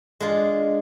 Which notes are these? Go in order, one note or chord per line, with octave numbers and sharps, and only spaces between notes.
G#3 D4 F4